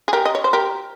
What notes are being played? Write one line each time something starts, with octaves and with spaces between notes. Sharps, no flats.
G#4
G4 A#4
D#5
C#5
C5
G4 A#4